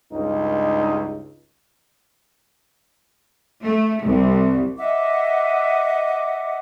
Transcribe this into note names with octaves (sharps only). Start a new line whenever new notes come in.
C#2 G2 D#4
A3
C2
D#5 E5 F#5 D6